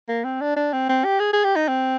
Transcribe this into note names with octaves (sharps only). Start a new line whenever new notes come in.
A#3
C4
D4
D4
C4
C4
G4
G#4
G#4
G4
D#4
C4